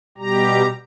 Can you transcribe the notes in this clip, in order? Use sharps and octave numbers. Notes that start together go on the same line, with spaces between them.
B2 G3 G4 A#5